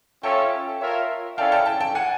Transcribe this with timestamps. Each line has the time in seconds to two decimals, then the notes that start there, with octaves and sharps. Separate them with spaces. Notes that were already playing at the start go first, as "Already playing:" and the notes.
0.23 C#4 F4 A4 C#5 E5 G5 A5
0.80 F4 A#4 C#5 E5
1.38 C#4 E4 A4 D5 F5 G5 A5
1.52 G5 A5
1.66 G5 A5
1.81 G5 A5
1.95 F#5 G#5